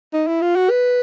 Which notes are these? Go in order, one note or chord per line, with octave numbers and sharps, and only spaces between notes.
D#4
E4
F4
F#4
B4